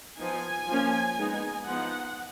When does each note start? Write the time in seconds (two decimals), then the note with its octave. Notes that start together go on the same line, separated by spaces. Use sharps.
0.19 F3 B3 D#4 G#5
0.68 F3 A#3 C#4
1.17 G#3 B3 D#4
1.66 F3 B3 D#4 F#5